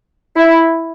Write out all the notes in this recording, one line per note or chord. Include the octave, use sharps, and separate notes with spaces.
E4